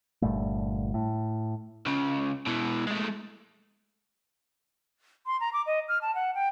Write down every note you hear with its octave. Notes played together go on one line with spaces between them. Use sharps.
G1 A#2 G3 A3
A2
C#2 C#3
B2 E3
G#3 A3
C6
A#5
D6
D#5
F6
A5
F#5
G5